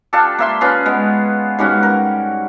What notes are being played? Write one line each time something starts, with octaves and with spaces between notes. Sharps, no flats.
D4 F4 G4 A4
A#3 E5 C6
C#4 F4 G#4 B4
G#3 B3
G#2 G3 C#4 F#4
A#4